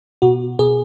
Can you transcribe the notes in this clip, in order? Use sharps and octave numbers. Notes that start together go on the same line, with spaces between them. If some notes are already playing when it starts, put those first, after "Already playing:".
B2 F#4
B2 G#4